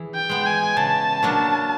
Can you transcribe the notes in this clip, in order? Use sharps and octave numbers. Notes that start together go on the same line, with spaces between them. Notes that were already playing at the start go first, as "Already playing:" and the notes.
Already playing: E3 G#4
G5
G#3 B3
G#5
C#3 A5
F#3 A#3 D4